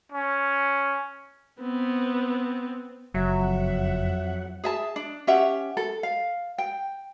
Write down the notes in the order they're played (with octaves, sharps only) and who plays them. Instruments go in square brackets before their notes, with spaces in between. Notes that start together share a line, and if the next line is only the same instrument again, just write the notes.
[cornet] C#4
[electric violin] B3 C4
[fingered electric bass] F#1 [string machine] F2 F#5 [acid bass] F#3 [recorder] E5
[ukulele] G#4 E5 A5
D4
C#4 G4 E5 F#5
A4
F5
G5